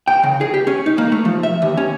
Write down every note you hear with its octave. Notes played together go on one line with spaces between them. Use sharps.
G5
C#3
G#4
G4
C#4
D#4
A#3
A3
F3
E5
D#2
C#4